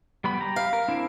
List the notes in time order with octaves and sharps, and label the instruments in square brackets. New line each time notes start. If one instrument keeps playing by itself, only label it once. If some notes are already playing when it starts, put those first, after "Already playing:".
[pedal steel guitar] G3 B3 B5
G4 A#5
[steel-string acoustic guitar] F5
[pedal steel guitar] A#4
C4 D4 E4